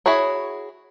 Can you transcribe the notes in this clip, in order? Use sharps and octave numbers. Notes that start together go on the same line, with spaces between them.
E4 F#4 G#4 C#5